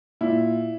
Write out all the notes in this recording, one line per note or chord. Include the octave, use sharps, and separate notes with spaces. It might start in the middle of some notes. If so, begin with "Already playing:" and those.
A#2 E4